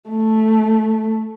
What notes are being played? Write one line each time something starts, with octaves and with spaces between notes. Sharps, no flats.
A3